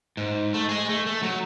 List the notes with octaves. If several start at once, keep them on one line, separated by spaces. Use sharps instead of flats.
G#2
A3
G#4 D#5
A3
A3
F#3